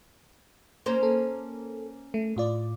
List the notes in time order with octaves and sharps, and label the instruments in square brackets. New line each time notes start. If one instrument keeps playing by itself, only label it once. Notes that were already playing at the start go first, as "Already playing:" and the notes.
[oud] A#3 C#4 C5
[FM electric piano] A4
A3
A2 F4 D5